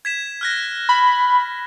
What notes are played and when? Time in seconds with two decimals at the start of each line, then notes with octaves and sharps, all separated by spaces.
0.05 G#6 B6 E7
0.41 F6 F#6 A#6
0.89 B5